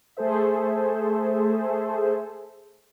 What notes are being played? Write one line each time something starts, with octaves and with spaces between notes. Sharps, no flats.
A3 G#4 A4 C5 E5